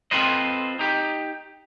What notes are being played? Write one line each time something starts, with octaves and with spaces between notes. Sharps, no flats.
C4 F4 A4 B4 C5 D#5
D#4 G4